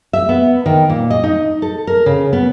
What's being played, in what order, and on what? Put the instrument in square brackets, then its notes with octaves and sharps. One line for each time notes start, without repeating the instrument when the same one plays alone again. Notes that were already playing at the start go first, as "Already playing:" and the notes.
[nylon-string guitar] E5
B3
D#3
A#2
D#5
D#4
A4
A#4
C#3
B3